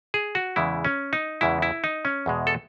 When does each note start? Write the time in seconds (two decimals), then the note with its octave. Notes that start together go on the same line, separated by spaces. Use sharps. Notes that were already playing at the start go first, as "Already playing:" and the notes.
0.14 G#4
0.35 F#4
0.56 E2 C#3 E3 G#3 E4
0.85 C#4
1.13 D#4
1.41 E2 C#3 E3 G#3 E4
1.62 E4
1.84 D#4
2.05 C#4
2.26 E2 B2 G#3
2.47 A4